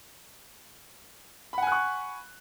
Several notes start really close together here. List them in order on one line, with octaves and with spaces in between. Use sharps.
B5 F#5 G#5 F#6 C#6